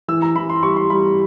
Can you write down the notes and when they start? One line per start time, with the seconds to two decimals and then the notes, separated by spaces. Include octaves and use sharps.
0.08 E3 E6
0.22 A#5
0.36 E3 B5
0.50 C6
0.63 G3 C#6
0.76 C6
0.90 G3 B5